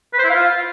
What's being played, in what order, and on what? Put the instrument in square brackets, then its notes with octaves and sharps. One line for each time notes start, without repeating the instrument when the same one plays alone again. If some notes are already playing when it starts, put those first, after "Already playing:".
[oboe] B4
C5
E4
F5
F4